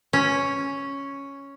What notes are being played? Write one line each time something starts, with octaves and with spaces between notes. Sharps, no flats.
C#4